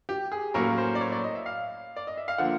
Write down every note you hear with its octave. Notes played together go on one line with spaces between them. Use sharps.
G4
G#4
A2 F#3 A#3 C#4 A#4
C5
D5
C#5
D5
D#5
E5
F5
D5
D#5
E5
F5
D3 F3 A#3 F#5